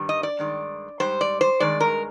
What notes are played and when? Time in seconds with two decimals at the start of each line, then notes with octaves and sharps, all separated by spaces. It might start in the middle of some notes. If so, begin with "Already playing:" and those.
Already playing: G2 D#3 G3
0.09 D#5
0.23 D5
0.39 G2 D#3 G#3
1.00 G#2 G3 C5
1.21 D5
1.41 C5
1.60 G2 D#3 G#3 D5
1.80 A#4